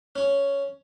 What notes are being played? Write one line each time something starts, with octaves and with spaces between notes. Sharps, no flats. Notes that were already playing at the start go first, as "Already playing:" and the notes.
C#4 C#5